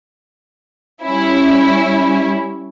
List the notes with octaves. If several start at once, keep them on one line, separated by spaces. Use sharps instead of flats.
G3 C#4 E4